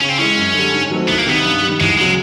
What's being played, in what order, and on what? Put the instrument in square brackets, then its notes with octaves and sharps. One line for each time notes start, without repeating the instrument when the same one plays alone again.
[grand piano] C#3 [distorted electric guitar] C#4
[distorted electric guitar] C4
[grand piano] E3 G#3 [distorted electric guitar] C#4
[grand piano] F#2
D3 G3
G#2
D#3 F#3 A3 C4
[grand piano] C2 [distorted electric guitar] B3
[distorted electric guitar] A#3
[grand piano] C3 D#3 [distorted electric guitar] B3
[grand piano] G2
G3
D#3
[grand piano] E2 [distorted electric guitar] G#3
[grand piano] C#3 F#3 [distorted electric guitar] G#3